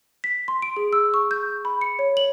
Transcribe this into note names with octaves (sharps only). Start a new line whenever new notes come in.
B6
C6
D7
G#4
E6
C#6
G6
B5
C#7
C#5
F#7